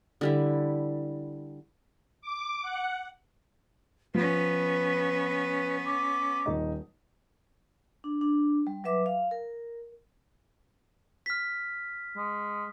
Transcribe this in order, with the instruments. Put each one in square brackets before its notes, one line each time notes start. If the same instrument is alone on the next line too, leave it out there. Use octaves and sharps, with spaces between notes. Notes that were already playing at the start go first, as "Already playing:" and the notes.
[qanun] D3 G3 E4
[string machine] D6
F#5
[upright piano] F3 [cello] B3 C#4 [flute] B4
[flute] D6
[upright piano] D#1 D#4
[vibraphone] D4
D4
G3
F#3 B4 E5 D6
F5
A#4
[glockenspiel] F6 B6
[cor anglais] G#3